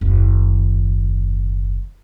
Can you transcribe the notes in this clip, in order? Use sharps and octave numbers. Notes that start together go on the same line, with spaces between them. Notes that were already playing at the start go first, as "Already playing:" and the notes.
F#1 D#2